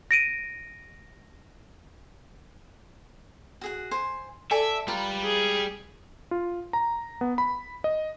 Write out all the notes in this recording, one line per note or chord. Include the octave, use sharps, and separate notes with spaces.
A#6 D7 D#7
F#4 G#4 F#5
C5 G#5
A4 D5 E5 G#5
G3 F4 B4 A#5
G#4
F4
A#5
B3
B5
D#5